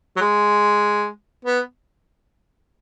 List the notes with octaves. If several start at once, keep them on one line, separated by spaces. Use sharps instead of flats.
F#3
G#3
B3